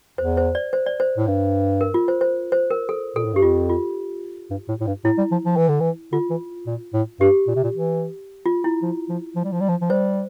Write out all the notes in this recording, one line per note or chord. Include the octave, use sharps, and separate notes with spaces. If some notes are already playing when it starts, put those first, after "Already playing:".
E2 C5
C5
D5
C5
D5
C5
A2
G2
A#4
F4
C5
C5
C5
A#4
A4
A#2 A4
A2
G2 G4
F2 F4
F4
G2
A2
A2
G2
A2 E4
G3
F3
F3
E3
D3
E3
D3 F4
E3
A#2
A2
G2 G4
A#2
C3
A#2
E3
F4
E4
F3
F3
F3
G3
F3
G3
F3
F3
G3 C5